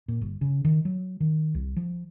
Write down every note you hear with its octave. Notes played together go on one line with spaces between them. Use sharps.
A#2
G1
C#3
D#3
F#3
D#3
C2
F3